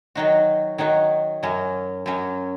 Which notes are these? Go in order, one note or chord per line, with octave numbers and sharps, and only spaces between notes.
D#3 F#3 D#4 F#4
D#3 F#3 D#4 F#4
F#2 F#3 C#4
F#2 F#3 C#4